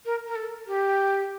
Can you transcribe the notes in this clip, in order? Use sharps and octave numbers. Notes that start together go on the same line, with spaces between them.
A#4
A#4
A4
G4